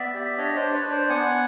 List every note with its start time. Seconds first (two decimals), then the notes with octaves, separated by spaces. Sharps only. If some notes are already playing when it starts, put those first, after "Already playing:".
Already playing: B3 D5 E5
0.14 G4
0.38 D4 C#5 D#5
0.56 C5 D5
0.62 D4
0.73 B4 C#5
0.85 D4
0.91 C5 D5
1.09 B3 F#5 G#5